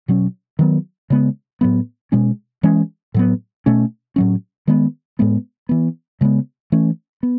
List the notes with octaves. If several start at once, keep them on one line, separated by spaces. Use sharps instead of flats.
B2 F#3 C#4
D#3 F#3 B3
C#3 G#3 B3
A2 F#3 B3
B2 G#3 C#4
E3 G#3 C#4
A2 F#3 B3
B2 A3 C#4
A2 F#3 C#4
D#3 G#3 B3
A2 G#3 B3
E3 B3
C#3 G#3 B3
E3 A3 C#4
B3